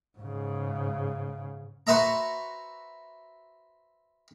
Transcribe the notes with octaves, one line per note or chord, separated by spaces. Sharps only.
G#2 C#3
F#4 B4 C5 E5 A#5